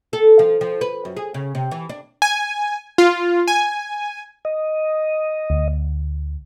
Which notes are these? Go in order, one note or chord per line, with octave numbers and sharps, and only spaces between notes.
A4
F3
F3
B4
F#2
G#4
C#3
C3
E3
D4
G#5
F4
G#5
D#5
D2